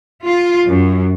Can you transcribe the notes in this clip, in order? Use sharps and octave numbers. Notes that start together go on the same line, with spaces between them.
F4
F#2